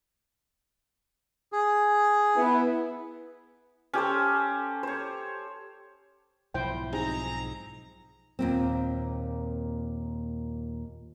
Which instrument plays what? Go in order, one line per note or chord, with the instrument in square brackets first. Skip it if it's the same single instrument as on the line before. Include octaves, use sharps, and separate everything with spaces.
[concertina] G#4
[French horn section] B3 E4
[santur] C#4 G4 A4 C5
C5 C#5
[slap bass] B1 G#2 F3 [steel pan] E4 C5 G5
[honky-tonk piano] C4 D#4 G#4 [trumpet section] A#5
[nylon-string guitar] D#2 A#2 C4